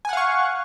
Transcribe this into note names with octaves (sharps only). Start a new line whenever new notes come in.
F5 F#5 G#5 C#6